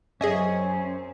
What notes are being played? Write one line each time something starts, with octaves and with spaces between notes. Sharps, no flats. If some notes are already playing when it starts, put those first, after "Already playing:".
F#2 C4 C#4 G#4 D#5 E5